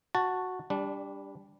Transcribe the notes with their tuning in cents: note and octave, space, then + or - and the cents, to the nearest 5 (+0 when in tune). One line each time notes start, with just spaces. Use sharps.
F#4 -5 A5 +10
G3 +15 D4 -15